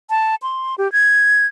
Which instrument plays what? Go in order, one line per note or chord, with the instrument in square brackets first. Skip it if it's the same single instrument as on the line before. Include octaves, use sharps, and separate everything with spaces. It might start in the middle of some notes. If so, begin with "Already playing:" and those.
[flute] A5
C6
G4
G#6